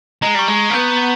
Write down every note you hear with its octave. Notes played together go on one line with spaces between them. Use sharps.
G#3 A#5
G3 C#6
G#3
A#5
A#3
B3 G6
A#5